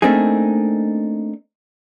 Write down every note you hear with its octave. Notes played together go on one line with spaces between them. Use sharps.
A3 A#3 C4 D4 D#4 G#4